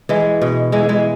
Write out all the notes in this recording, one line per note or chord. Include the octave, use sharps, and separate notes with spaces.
E3 G#3
B2
E3 G#3
E3 G#3